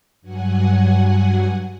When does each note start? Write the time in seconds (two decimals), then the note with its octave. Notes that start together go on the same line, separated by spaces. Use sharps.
0.21 G2 F#3 F#5 G#5